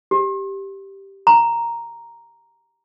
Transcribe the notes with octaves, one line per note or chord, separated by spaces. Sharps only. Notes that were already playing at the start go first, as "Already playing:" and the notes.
G4
A#5